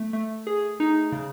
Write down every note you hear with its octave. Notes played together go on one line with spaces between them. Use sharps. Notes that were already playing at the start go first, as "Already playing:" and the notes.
Already playing: A3
A3
G#4
D#4
C#3